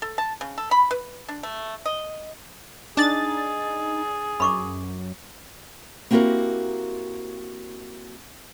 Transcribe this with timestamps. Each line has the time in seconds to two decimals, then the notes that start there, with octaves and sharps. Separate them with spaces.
0.02 A4
0.18 A5
0.41 C#3
0.58 A4
0.71 B5
0.91 B4
1.28 D4
1.43 A3
1.86 D#5
2.97 D4 D#4 G#4 A6
4.40 F#2 B5 C#6 D6
6.11 A#3 C4 E4 F#4 G4 A#4